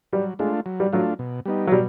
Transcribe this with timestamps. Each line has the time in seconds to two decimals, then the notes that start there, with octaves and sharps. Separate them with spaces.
0.13 F#3 G3
0.39 G#3 A3 D4 F4
0.66 F#3
0.80 G3
0.93 F#3 A3 D4 F4
1.19 B2
1.45 G3 B3 D#4
1.67 F#3
1.71 B2 G3